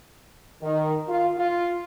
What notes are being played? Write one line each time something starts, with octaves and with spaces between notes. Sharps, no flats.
D#3
F4
F4